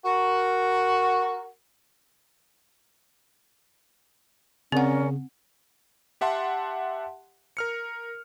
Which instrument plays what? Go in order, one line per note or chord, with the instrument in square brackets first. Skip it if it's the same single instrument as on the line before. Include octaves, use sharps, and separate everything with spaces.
[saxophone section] F#4 A#4
[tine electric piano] C#3 [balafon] C4 F#5 [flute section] C#4 A#4 D5
[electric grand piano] G4 E5 F#5 A5 C6
A#4 F6 C#7